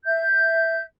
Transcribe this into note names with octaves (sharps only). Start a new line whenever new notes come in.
E5 G6